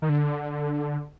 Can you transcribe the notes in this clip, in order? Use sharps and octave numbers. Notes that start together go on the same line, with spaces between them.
D#3
D3